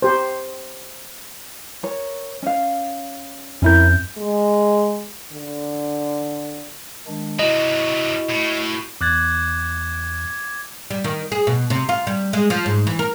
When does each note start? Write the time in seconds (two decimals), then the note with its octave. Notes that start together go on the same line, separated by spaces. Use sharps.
0.02 G4 C5
1.83 A#4 C#5
2.42 C#4 F5
3.62 F2 C#4 E4 A#4 G6
4.18 G#3
5.33 D3
7.07 D#3 G#3 D4
7.39 C3 F#3 E4 F#4 D#5
8.30 A2
9.01 E2 D6 F#6 G#6 A6
10.90 G3
11.04 D#3
11.32 G#4
11.47 B2
11.70 C3
11.89 F4
12.07 G3
12.33 G#3
12.50 F3
12.66 G#2
12.87 E3
12.99 A#4